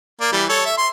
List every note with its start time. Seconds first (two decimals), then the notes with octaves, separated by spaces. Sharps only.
0.21 A#3 D5
0.32 E3 G3
0.49 A4 C#5
0.66 E5
0.78 C6